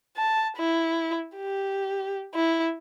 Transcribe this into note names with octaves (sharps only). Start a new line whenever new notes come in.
A5
E4
G4
E4